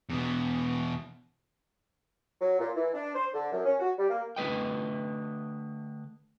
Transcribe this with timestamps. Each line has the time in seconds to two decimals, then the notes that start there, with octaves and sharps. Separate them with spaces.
0.09 E2 B2
2.41 F#3
2.59 A#2
2.75 E3
2.94 D4
3.14 C5
3.33 D3
3.52 F#2
3.65 C#4
3.80 F#4
3.98 G3
4.09 A#3
4.36 D3 A3 B4 D#5 G5